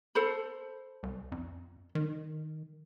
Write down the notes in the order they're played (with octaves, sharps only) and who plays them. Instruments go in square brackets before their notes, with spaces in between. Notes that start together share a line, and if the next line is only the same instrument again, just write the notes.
[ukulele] A4 C5 B5
[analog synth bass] C2
F2
D#3